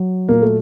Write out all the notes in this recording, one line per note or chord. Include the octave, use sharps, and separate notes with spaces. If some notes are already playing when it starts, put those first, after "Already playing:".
Already playing: F#3
A#2 F#3 A#3
A3